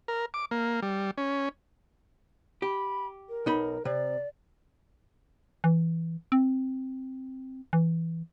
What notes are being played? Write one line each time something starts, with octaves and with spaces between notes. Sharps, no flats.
A#4
D6
A#3
G3
C#4
G4 B5
A#4
B1 D#4 B5
C3 D5
E3
C4
E3